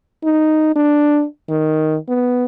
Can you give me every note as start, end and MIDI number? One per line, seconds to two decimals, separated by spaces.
0.24 0.71 63
0.76 1.24 62
1.49 1.96 51
2.08 2.45 59